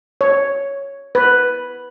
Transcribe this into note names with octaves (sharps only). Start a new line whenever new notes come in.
C#5
B4